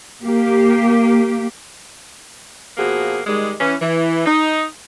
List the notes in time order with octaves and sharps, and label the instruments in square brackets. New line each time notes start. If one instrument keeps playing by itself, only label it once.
[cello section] A#3 G4
[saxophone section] B2 F3 A#3 F#4 G#4
D#3 G3 G#3
E3 C#4
E3
D#4